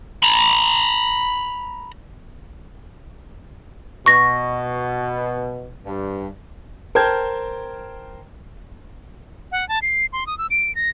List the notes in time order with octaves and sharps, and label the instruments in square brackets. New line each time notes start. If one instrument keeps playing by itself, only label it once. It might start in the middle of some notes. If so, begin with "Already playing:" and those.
[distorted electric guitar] A#5 B5
[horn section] B2 [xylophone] C#6 A#6
[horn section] G2
[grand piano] A#4 C5 G5 A5 G6 G#6
[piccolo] F#5
A5
C7
C6
D#6
E6
D7
A#6